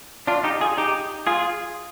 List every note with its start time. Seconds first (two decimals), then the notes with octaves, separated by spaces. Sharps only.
0.27 D4 F4
0.44 D#4 G4
0.61 F4 G#4
0.77 D#4 G4
1.27 F4 G#4